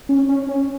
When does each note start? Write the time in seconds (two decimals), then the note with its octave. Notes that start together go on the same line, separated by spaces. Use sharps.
0.09 C#4
0.29 C#4
0.49 C#4